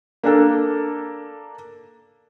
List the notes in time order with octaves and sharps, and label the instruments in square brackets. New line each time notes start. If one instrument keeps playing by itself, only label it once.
[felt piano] A#3 D4 A4